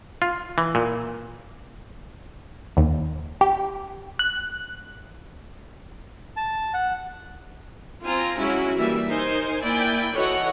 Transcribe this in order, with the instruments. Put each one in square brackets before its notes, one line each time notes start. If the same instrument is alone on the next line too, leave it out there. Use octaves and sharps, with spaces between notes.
[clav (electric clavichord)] F4
E3
A#2
[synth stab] D#2
G4
F#6
[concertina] A5
F#5
[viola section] C4 F4 G#5 A#5
F#3 G#3 C#4 E4 F#4
E3 G3 A#3 E5
D#4 A#4 C5 G#5
A#3 E4 D5 G5 G#5 B5
E3 F#4 A4 C#5 D#5 F#5